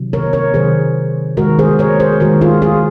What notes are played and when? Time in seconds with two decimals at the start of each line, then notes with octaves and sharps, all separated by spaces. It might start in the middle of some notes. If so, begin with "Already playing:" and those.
Already playing: C3 D#3 F#3
0.13 A#4 C#5
0.33 A#4 C#5
0.54 C3 D#3 F#3 G#4 C5
1.37 D#3 G#3 F#4 A#4
1.59 G#4 C5
1.79 A#4 C#5
2.00 G#4 C5
2.20 D#3 G#3 F#4 A#4
2.41 F4 G#4
2.62 F4 G#4